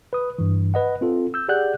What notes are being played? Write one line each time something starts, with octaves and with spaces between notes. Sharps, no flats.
B4 D#6
G2 E3
B4 D#5 F#5
C4 F4 A4
E6 G6
G4 G#4 D5 F#5 F#6 G6